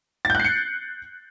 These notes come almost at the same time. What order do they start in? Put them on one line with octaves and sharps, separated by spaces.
A6 G6 F#6 C7 C#7